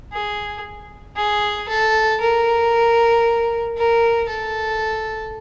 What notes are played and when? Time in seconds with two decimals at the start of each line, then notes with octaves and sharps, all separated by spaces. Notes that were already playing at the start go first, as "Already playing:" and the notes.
0.12 G#4
1.16 G#4
1.68 A4
2.20 A#4
3.77 A#4
4.29 A4